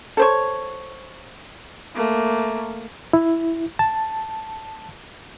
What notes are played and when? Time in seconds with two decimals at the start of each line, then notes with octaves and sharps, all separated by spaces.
0.17 A4 C5 C#5
1.95 A3 A#3
3.13 E4
3.79 A5